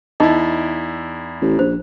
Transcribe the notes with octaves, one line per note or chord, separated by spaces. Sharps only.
E2 D#4 E4 D#5
A1
A#1 C5